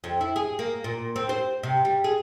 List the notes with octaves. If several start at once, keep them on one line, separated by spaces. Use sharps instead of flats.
F2
E4
G#4
A#3
A#2
C4
C5
C3
G3
G#4